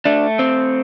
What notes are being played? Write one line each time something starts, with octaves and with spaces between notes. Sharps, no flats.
A3 D4
C4